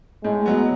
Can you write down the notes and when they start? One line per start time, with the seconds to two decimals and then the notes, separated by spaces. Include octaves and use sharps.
0.24 A2 G#3
0.46 F#3 B3